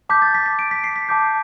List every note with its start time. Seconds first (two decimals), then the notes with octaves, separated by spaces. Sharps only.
0.09 A5 D6 G6 B6
0.22 A6
0.34 B6
0.46 B6
0.59 D7
0.71 B6
0.84 C7
0.96 B6
1.09 A5 D6 G6